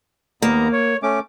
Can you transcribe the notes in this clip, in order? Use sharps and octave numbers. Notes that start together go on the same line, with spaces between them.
D#2 A#3 B3 A#5
C#5
A3 C#4 D6